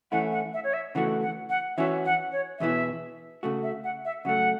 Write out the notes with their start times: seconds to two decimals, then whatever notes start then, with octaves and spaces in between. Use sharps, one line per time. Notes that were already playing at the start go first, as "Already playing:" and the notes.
0.12 E3 A3 C#4 E4 F#5
0.32 F#5
0.54 E5
0.64 C#5
0.74 E5
0.95 C#3 E3 A3 F#4 F#5
1.21 F#5
1.50 F#5
1.77 E3 C#4 F#4 E5
2.05 F#5
2.32 C#5
2.59 E2 B2 B3 E4 E5
3.43 C#3 A3 F#4
3.63 E5
3.84 F#5
4.05 E5
4.25 C#3 F#3 A3 F#5